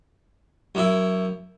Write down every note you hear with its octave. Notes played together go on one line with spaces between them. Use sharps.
F#2 E4